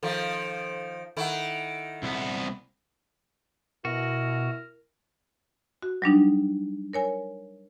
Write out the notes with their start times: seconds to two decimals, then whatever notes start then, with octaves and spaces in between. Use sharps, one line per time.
0.03 D#3 F3 A4 F5
1.17 D#3 E4 A4 F#5
2.03 C2 B3
3.85 B2 E4 F#4 A#4
5.83 F#4
6.02 F#3 G3 D4 D#4
6.93 A#4 C#5 G#5